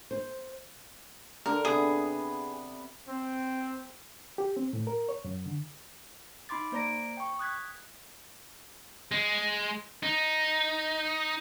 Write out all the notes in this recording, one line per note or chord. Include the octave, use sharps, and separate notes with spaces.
C5
D3 A#4
C3 B3 G#4 D#6
C4
G4
C4
A2
A#4
C#5
F#2
D3
D#4 B5 C6 D6 A6
A#3 C5 D5 A#5 A#6 D7
G5 C#6
D#6 F#6 G#6 B6
G#3
D#4